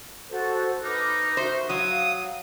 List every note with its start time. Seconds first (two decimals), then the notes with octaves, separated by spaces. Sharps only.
0.30 F#4 A4 C5
0.83 D#4 B4 D6 F6
1.37 F#4 C5 E5
1.70 F#3 F5 D#6